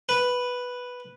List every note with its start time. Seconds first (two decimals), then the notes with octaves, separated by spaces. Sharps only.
0.09 B4